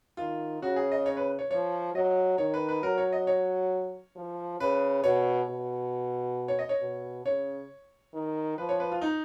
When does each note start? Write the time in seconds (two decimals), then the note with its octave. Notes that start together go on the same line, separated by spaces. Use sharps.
0.17 D#3 F4
0.62 C#3 F#4
0.76 G#4
0.92 D#5
1.06 C#5
1.17 B4
1.39 C#5
1.51 F3 C#5
1.94 F#3 D#5
2.38 D#3 C#5
2.54 B4
2.69 B4
2.82 F#3 A#4
2.98 C#5
3.12 D#5
3.27 C#5
4.15 F3
4.60 C#3 B4
5.03 B2 C#5
5.49 B2
6.48 C#5
6.59 D#5
6.69 C#5
6.81 B2
7.25 C#3 C#5
8.13 D#3
8.57 F3 B4
8.69 C#5
8.80 B4
8.92 F4
9.01 D#4